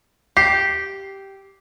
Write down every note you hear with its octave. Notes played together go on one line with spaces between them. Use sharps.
G4 C7